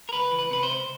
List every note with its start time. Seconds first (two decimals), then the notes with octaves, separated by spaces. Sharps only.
0.09 A#4
0.13 C#2 B4
0.32 E3
0.39 B4
0.51 C3 B4
0.63 C5
0.70 C#2